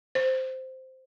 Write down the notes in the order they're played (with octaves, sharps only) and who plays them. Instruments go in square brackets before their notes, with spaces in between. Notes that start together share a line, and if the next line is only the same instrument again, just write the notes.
[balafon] C5